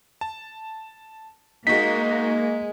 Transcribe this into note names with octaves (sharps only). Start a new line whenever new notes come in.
A5
G#3 A#3 D#4 F#4 B6